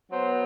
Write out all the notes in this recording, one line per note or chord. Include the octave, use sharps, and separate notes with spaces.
F#3 B3 C5